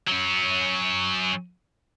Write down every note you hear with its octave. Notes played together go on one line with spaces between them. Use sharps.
F#3 C#4